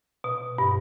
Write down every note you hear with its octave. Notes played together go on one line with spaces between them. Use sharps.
B2
G2